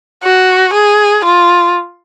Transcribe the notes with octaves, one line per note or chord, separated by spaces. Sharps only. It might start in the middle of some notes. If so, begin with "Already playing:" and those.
F#4
G#4
F4